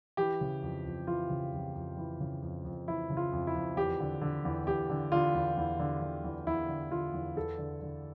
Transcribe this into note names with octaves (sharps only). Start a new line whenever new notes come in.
E3 G4
C#3
F2
F2
E3 F4
C#3
F2
F2
E3
C#3
F2
F2
E3 E4
C#3
F4
F2
E4
F2
E2 G4
D3
D3
E2
E2 G4
D3
D3 F4
E2
E2
D3
D3
E2
E2 E4
D3
D3 F4
E2
E2 A4
D3
D3